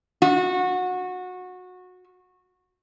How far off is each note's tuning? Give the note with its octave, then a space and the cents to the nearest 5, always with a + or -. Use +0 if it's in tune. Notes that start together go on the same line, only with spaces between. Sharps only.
F#4 -20